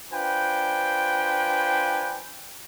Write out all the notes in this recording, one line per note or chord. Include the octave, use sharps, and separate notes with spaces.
D4 F4 B4 C5 G5 G#5